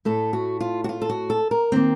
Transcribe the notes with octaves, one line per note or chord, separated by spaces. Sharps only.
A2 A3 A4
F#4
F4
F#4
F4
A4
F#4
A4
A#4
D#3 A#3 C4